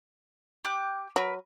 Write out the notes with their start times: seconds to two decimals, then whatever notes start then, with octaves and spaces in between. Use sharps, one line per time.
0.65 G4 D6 F#6
1.16 F#3 A#4 B4